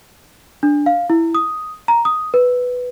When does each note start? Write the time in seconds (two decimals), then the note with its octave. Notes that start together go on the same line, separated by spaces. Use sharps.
0.63 D4
0.86 F5
1.10 E4
1.35 D#6
1.88 A#5
2.05 D#6
2.34 B4